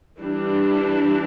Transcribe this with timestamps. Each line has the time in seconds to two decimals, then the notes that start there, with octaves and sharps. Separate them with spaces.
0.20 E3 G3 D4 G4